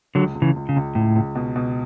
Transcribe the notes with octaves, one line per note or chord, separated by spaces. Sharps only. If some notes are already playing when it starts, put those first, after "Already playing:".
C#2 D3 F#3
C#2
C#3 E3
C#2
C#3
C#2
C#2 A2
C#2
B2
B2